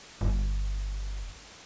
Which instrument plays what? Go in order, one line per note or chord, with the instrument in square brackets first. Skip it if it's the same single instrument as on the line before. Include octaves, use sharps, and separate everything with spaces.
[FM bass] G1